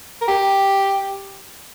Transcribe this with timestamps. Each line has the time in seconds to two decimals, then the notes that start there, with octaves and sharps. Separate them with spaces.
0.21 A#4
0.28 G4